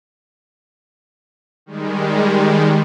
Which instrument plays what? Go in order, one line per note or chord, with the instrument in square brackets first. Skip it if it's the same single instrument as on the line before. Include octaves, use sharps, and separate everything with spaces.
[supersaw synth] D#3 G3 G#3